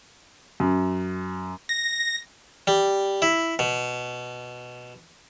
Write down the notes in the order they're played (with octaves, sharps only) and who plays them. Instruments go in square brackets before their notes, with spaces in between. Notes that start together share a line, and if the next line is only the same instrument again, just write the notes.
[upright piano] F#2
[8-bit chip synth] A#6
[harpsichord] G3
E4
B2